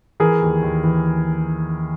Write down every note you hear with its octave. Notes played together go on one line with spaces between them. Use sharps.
E3 G#4 A#4
D#2
D#2
E3